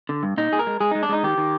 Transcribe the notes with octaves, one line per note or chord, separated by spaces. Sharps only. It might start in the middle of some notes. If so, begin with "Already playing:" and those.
D3
G2
A#2 D#4
A#2 G#4
A#4
G#3
G#3 G#4
G#3 D#4
D4
G#3 D#4
D#3 G4
D#3